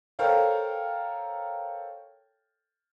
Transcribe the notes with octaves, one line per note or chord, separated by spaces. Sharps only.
A4 A#4 C5 C#5 F5 G5